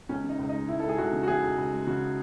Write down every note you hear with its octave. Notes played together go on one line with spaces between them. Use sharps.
C#2 C#4
C#3
D#4
C#2
D#4
G#3
C#2 E4
C#2 A4
G#4
C#2 F#4
C#3
F#4
C#3 G#4
C#2
C#2
G#3
C#3 F#4